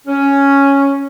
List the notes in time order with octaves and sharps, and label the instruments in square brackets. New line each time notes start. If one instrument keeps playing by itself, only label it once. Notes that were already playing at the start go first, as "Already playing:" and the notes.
[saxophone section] C#4